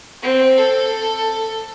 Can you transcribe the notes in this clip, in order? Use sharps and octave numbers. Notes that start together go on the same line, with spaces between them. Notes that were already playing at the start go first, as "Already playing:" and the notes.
C4
A4